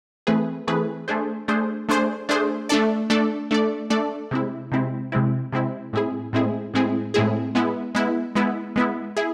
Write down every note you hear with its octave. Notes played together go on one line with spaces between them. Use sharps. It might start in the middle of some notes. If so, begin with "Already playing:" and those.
E3 A3 C4 G#4 B4
E3 A3 C4 G#4 B4
A3 D4 G#4 C5
A3 D4 G#4 C5
A3 D4 G#4 C5
A3 D4 G#4 C5
A3 D4 A4 D5
A3 D4 A4 D5
A3 D4 A4 D5
A3 D4 A4 D5
C3 G#3 C4 E4
C3 G#3 C4 E4
C3 G#3 C4 E4
C3 G#3 C4 E4
A2 G#3 C4 E4 G#4
A2 G#3 C4 E4 G#4
A2 G#3 C4 E4 G#4
A2 G#3 C4 E4 G#4
G#3 B3 E4
G#3 B3 E4
G#3 B3 E4
G#3 B3 E4
E4 G#4